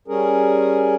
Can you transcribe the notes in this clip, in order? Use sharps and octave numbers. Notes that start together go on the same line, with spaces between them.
G3 C#4 G#4 A#4